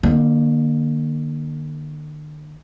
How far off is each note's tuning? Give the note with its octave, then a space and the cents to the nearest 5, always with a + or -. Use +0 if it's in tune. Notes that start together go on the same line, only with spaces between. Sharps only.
D3 +45 A#3 +15